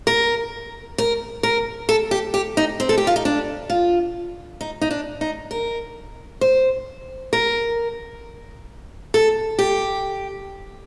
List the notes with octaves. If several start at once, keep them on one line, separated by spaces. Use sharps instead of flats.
A#4
A#4
A#4
A4
G4
G4
D#4
C4
A4
G4
F4
D#4
D4
F4
D#4
D#4
D4
D#4
A#4
C5
A#4
A4
G4